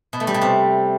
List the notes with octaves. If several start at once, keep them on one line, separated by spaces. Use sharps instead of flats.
B2
A3
G3
B2
C3